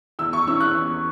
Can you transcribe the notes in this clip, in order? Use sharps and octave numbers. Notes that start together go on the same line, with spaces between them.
E2 E6
C#6
E3 C#4 E6
F#6
E2